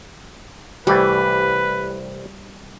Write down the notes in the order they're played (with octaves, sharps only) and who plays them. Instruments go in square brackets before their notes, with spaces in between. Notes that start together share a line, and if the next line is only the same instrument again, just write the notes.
[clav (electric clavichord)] C2 E3 A3 [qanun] G3 [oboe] B4